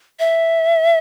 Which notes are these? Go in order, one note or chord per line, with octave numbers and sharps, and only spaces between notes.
E5